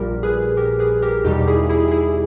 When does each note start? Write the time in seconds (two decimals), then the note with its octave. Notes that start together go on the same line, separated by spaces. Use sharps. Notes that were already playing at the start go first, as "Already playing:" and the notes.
Already playing: A#1 A#2 G3 G4 A#4
0.23 G#4 B4
0.57 G4 A#4
0.79 G#4 B4
1.02 G4 A#4
1.24 E2 B2 G3 D#4 G4
1.47 E4 G#4
1.69 E4 G#4
1.91 E4 G#4